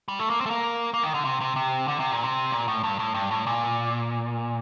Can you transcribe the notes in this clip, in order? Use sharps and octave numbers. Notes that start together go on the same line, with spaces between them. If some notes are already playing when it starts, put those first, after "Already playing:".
G3
A3
A#3
C4
A3
A#3
A#3
D#3
D3
C3
C3
C3
D3
C3
A#2
C3
A#2
A2
G2
A2
G2
A2
A#2